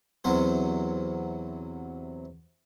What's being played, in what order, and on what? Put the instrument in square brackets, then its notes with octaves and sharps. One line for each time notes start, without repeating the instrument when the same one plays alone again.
[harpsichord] E2 C3 F#3 C5